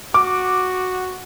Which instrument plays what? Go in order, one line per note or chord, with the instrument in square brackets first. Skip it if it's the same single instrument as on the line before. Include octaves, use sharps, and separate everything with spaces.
[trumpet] F#4 [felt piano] D6